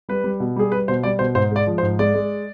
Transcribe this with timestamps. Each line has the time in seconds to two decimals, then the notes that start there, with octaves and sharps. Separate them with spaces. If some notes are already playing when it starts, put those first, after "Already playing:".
0.09 G3 B4
0.24 G3
0.40 B2
0.56 G3 G#4
0.72 G3 B4
0.88 B2 C5
1.03 G3 D5
1.19 B2 C5
1.35 G#2 C5
1.51 G#3 D5
1.67 F3
1.78 C5
1.82 G#2
1.99 G#3 D5
2.14 G#3